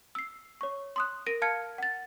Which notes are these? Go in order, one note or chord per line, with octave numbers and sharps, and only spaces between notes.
E6 C7
C#5 C#6
C6 D#6 F#6
A#4 A#6 D7 D#7
F5 A5 F6 G#6 C#7
F#5 A6